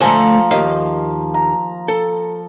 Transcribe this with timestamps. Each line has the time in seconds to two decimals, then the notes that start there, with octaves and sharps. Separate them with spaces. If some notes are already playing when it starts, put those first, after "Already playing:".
0.01 D3 F3 A3 C5 G#5 A#5
0.51 D#2 A#3 D#5 F5
1.34 A#5
1.88 A4